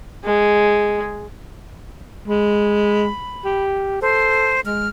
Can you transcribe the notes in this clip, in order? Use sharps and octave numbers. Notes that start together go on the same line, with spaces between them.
G#3
G#3 B5
G4
A4 C5
G#3 F6